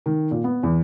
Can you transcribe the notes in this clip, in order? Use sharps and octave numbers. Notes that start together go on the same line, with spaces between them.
D#3
A#2
B3
E2